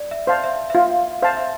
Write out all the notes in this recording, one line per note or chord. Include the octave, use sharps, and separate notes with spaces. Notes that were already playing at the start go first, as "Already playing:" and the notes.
Already playing: D5
E5
C5 F5 A5
E5
E5
F4 F5
C5 F5 A5
E5